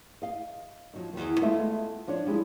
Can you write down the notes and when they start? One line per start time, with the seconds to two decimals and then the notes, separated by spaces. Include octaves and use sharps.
0.22 D#5 F5
0.94 F3 F#3 D#4
1.13 E2 B2 D#3
1.41 G#3 A3 B3 F4 D#5 E5
2.07 F3 D4 F4 C#5
2.26 F3 G3 G#3 E4